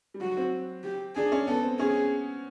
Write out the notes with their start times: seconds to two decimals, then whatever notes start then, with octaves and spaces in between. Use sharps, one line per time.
0.14 G3
0.20 F#3 F#4
0.37 C4
0.84 G4
1.15 D4 G#4
1.32 C#4
1.47 B3 A4
1.63 C4
1.79 C#4 G#4